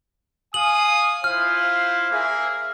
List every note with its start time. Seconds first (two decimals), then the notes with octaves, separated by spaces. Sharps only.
0.54 F5 G#5 D#6 F#7
1.24 E4 F4 C5 F6
2.11 A#3 G#4 E5